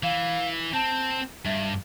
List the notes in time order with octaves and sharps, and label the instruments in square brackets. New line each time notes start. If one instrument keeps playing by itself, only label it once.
[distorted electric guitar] E3 [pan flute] F5
[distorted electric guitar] C4 [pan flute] A5
[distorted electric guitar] G2 [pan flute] E5